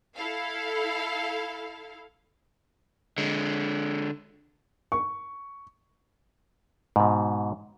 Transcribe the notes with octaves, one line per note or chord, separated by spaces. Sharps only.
E4 A4 F5
D3 G#3
C#6
G#2 B2